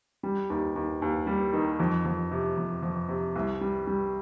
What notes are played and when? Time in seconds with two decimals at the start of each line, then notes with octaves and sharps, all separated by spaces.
0.23 G3
0.50 D#2
0.76 D#2
1.02 D#2
1.27 G3
1.53 D#3
1.80 F2
2.05 F2
2.32 C3
2.58 F2
2.83 F2
3.09 C3
3.36 C2
3.61 G3
3.87 G3